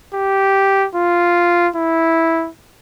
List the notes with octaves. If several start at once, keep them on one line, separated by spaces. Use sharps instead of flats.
G4
F4
E4